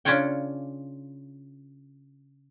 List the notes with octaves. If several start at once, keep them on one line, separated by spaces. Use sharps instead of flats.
C#3 C#4 D4 F4 C#5 G5